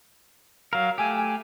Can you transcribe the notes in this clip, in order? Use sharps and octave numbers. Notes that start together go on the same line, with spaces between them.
F#3 A#4 F5
A3 G4 G#5
G#5